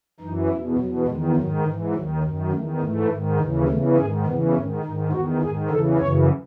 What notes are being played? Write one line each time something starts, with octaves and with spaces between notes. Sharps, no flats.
F#2 E3 D#4
E2 B2 E4
E2 B2 F#3
E2 D#3 G#3
G#2 D#3 F#3
G#2 E3
D#2 D#3 F#3
F#2 D#3
E2 D#3 A3
G#2 E3 A3
G#2 D#3
D#2 C#3 E3
E2 C#3 E3 A3
G#2 D#3 G#4
E2 C#3 E3 B3
G#2 D#3 C#4
G#2 D#3 D#4
E2 D#3 F#4
G#2 D#3 G#4
E2 C#3 E3 A4
F#2 C#3 E3 C#5